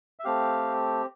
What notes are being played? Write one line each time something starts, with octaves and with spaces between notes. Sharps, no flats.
E5
A3 C4 G4 F5